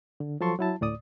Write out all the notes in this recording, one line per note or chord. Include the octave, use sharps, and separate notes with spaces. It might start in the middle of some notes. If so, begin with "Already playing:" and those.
D3
F3 F#3 A4 A5 C6 C#6
F#3 E4 A5
D2 A2 D5 D#6